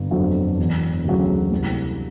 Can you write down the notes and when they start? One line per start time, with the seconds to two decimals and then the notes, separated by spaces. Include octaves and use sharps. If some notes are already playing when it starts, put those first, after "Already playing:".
Already playing: G1
0.11 F2 D3 F#3
0.58 E1
1.05 D2 C#3 F#3
1.52 C2